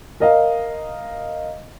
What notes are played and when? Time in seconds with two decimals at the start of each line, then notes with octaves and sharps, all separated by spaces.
0.20 A#4 D#5 F5